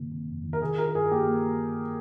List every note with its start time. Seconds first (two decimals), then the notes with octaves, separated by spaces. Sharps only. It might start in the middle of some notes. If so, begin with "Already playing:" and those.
Already playing: G2 C3 D#3 A#3
0.11 C3
0.28 F2
0.44 D#3
0.53 A#4
0.61 D#3 G#4
0.78 F4 A#4
0.95 G2 G#4
1.11 A#3 G4
1.27 A#3